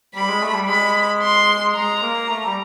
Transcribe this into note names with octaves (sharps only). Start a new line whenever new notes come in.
G3 B5
G#3
A3
G3
G#3 B5
C6
G#3 A#5
A#3
A3
G3